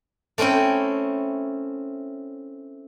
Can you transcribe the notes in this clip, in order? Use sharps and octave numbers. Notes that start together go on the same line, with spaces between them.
A3 C4 C#4 E4 G5